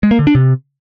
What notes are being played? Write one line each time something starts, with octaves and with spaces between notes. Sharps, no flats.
G#3
A#3
D3
D4
C3